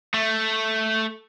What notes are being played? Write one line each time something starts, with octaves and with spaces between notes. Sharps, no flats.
A3